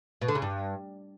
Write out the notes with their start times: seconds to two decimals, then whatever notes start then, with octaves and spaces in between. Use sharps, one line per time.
0.21 B2
0.28 D3
0.35 C#3
0.42 G2